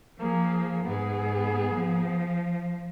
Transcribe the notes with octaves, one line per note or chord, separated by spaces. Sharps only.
F3 A#3 G#4
G#2 B3 G#4
F3